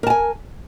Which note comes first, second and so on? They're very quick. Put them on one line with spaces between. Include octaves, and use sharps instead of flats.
A#4 A5 G#5